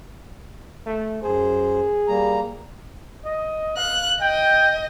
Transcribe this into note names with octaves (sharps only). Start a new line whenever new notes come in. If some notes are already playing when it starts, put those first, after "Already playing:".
A3
F#2 G#4 C5
G3 A#3 A#5
D#5
F5 F#6
D#5 G5